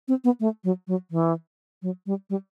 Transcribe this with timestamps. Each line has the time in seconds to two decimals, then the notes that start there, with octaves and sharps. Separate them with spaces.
0.08 C4
0.24 B3
0.40 A3
0.64 F#3
0.88 F#3
1.11 E3
1.82 F#3
2.06 G3
2.30 G3